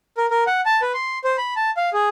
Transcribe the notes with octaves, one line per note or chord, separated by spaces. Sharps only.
A#4
A#4
F#5
A5
B4
C6
C5
B5
A5
F5
G#4